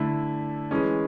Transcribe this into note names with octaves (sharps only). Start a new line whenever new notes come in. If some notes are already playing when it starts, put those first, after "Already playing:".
Already playing: D3 A3 E4
E3 G#3 C#4